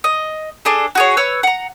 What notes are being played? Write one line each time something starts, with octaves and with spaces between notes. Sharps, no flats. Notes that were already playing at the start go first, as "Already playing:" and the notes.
D#5
D4 G#4 A4
F#4 G#4 C#5
B4 C#5 E6
F#5 A#5